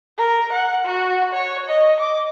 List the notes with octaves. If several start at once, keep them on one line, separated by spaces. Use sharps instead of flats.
A#4
F#5
F#4
C#5
D#5
D6